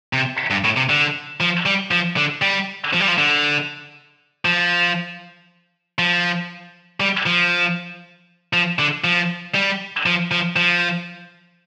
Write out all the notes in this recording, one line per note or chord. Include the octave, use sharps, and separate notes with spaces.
C3
G2
A2
C3
D3
F3
G3
F3
D3
G3
F3
G3
F3
D3
F3
F3
G3
F3
F3
D3
F3
G3
F3
F3
F3